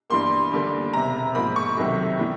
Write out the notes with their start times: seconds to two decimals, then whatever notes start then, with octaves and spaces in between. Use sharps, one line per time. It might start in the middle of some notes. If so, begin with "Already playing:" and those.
0.10 G2 E3 G3 A#3 C6
0.52 D#2 D3 G3 A#3
0.93 E1 E2 C3 A#5
1.35 G#2 F3 A#3 B5
1.56 C#6
1.77 C2 C3 D#3 F#3 A3
2.19 A2 E3 G3